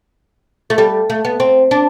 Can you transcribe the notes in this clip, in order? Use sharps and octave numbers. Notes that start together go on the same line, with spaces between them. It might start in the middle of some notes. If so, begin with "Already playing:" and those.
A3
G3
A3
B3
C4
D4